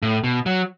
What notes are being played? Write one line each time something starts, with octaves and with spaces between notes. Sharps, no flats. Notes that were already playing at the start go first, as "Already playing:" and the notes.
A2
B2
F#3